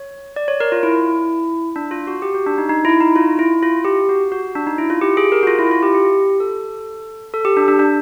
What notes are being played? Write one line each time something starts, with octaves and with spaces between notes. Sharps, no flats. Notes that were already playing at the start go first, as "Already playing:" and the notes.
Already playing: C#5
D5
C#5
A#4
F4
E4
D4
F4
F#4
G4
F#4
D4
D#4
D#4
E4
D#4
F4
E4
F4
G4
F#4
F#4
D4
D#4
E4
F4
G4
G#4
A#4
F#4
F4
E4
F4
G4
G4
A4
A4
G4
D4
D4
D4